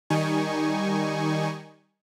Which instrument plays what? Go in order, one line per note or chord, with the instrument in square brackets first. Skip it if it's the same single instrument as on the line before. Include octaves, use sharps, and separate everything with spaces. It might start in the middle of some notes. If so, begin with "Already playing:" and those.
[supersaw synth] D#3 G3 D#4 G#5 C#6